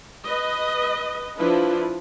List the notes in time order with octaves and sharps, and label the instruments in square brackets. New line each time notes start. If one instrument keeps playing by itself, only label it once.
[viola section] B4 D#5
F3 D4 E4 B4